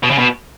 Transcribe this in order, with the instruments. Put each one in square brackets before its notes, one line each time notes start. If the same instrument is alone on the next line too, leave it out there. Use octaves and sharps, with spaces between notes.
[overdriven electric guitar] B2
C#3
B2